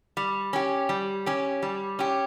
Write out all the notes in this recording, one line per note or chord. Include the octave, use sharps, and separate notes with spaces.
G3
C#4 G4
G3
C#4 G4
G3
C#4 G4